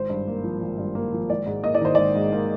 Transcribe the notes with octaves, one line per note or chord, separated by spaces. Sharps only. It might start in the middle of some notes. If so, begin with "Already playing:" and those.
Already playing: G#1 C5
G2
A#3
F3
G#1
G2
A#3
F3
G#1 D5
G#2
A#3 D#5
D5
D#3 C5
G#1 D5
G#2
A#3